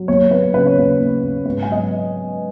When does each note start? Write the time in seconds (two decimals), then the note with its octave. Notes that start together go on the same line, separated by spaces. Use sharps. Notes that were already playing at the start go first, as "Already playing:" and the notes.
Already playing: F#3
0.08 D#2 C#5
0.31 D#2 B4
0.54 C#3 B4
0.67 C#5
0.77 D#2 B4
1.00 D#2
1.23 D#2
1.45 G#2 B4
1.63 G#5
1.69 F#3 D#5